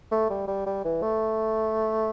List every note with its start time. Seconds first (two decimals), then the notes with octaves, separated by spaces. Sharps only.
0.11 A3
0.30 G3
0.47 G3
0.66 G3
0.84 E3
1.02 A3